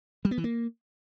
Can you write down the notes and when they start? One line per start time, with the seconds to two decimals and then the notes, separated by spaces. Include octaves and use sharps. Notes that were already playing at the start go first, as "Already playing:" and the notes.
0.25 G3
0.31 B3
0.38 E3
0.44 A#3